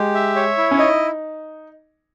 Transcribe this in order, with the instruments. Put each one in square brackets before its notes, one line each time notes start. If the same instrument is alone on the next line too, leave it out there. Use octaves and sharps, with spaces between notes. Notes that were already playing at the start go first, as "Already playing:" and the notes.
Already playing: [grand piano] G#3 [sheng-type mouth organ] G4
[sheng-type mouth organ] E5
C#5
E4
[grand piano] C#4
[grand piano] D#4 [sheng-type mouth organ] D#5